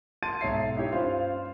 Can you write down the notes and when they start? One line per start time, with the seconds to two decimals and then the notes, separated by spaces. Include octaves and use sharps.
0.23 A5 C6 A6 D#7
0.41 B1 G#2 C#5 E5 C7
0.76 D#4 E4 G4 C#5
0.91 G2 C#4 F4 C5 F5